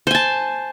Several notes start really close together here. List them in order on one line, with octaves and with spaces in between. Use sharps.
C5 G#5 A5